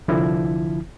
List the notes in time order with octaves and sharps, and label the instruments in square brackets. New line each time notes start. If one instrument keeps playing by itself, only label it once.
[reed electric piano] C2 D3 F3 E4